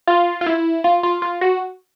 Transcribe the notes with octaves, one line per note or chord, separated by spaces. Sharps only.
F4
F4
E4
F4
F4
F4
F#4